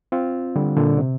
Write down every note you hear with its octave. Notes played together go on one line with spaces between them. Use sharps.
C4 F4
D3 G3
A#2 D3
C3